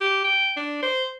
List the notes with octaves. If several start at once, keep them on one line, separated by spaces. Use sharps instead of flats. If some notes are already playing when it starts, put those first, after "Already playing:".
G4
G5
D4
C5